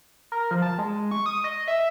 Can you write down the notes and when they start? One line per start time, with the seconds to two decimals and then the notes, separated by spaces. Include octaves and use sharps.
0.32 A#4
0.51 F3
0.62 A5
0.78 G#3
1.11 C#6
1.26 D#6
1.44 D#5
1.68 E5